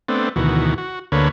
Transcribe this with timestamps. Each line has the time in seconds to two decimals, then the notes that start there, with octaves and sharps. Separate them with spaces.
0.08 A3 B3 C4 D4
0.36 D2 B2 D#3 E3 F#4
0.78 F#4
1.12 D2 D3 A#3 B4 C#5